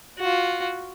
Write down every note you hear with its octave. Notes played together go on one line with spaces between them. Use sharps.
F4 F#4